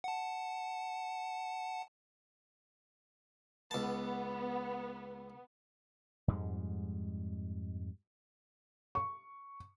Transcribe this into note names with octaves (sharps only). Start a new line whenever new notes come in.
F#5 A5
C#2 B3 A5
F2 G#2 G3 G#3
C#6